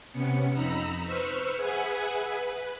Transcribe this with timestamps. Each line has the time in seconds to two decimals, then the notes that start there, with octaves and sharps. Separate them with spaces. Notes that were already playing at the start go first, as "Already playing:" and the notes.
0.12 C3 B3 C#4 C#7
0.53 F2 D#4 A#5 B5 E6
1.05 B4 C5 C#6 E6 F6
1.57 G#4 B4 E5 F#5 G#5
2.25 B4